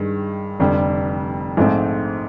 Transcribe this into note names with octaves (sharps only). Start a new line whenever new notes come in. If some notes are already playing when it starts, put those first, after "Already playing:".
Already playing: G2 D#3 G#3
F1 F2 D3 G3
A#1 G#2 F3 A3 C4